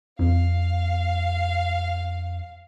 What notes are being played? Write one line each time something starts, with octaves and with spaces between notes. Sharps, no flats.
F2 F5